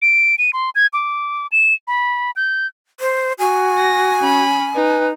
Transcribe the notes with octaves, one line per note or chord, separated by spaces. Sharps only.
D7
D#7
C6
G#6
D6
E7
B5
G6
C5
F#4 G#5
A#6
C#4 B5
D#4 B4